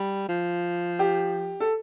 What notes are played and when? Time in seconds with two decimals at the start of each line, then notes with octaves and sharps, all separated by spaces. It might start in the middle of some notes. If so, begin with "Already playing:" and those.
Already playing: G3
0.29 F3
0.99 G4
1.60 A4